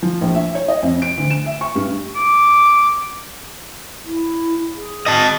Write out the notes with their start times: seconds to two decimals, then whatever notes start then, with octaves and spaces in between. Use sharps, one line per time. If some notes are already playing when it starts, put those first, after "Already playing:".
0.03 F3
0.21 A#1
0.35 E5
0.55 C#5
0.68 D#5
0.83 F2
1.02 D7
1.18 D2
1.30 E7
1.46 E5
1.61 C#6
1.76 G2
2.16 D6
4.05 E4
4.75 G#4
5.06 D#5 A5